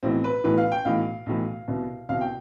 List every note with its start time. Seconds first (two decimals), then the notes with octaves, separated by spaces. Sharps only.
0.03 B1 A2 E3 C4
0.24 B4
0.44 B1 A2 E3 B4
0.58 F5
0.72 G5
0.85 B1 A2 E3 F5
1.26 B1 A2 E3
1.68 C2 B2
2.09 C2 B2 F5
2.21 G5